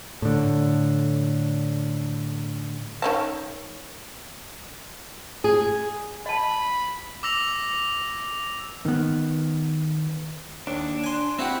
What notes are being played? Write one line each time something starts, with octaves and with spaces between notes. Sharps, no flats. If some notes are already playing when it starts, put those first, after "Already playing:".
A2 D3
D#3 C#4 A5
G#4
D#5 A5 B5
D6 E6 A#6 F7
D#3 B3
D#2 D4
G#5 C6
C4 E4 F#4 G4